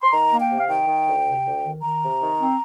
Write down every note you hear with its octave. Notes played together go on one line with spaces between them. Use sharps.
C6
D#3 A#5
A#3
G5
C3
F5
D#3 G5
D#3
D2
C3
D2
D#3
D#3 A#5
C3
D#3
C4